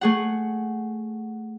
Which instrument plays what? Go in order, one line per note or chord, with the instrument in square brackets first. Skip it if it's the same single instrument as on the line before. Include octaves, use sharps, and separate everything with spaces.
[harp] A3 G#4 F#5